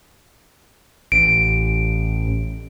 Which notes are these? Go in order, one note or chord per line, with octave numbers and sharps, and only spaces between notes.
A1 D7